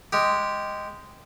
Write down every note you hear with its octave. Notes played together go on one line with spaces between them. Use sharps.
G#3 G4